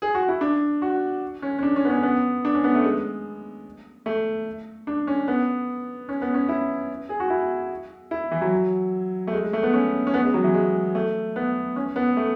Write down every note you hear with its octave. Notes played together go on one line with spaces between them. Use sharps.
G#4
F#4
E4
D4
F#4
C#4
C#4
D4
C#4
B3
C#4
B3
D4
C#4
B3
A3
G#3
A3
D4
C#4
B3
C#4
B3
C#4
E4
G#4
F#4
E4
E4
E3
F#3
A3
G#3
G#3
A3
B3
C#4
C#4
B3
G#3
F#3
E3
G#3
A3
B3
C#4
B3
A3